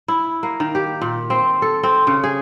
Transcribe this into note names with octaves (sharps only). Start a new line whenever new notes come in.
E4
A#3
D#3
G4
A#2
C4
A4
C4
C#3
G#4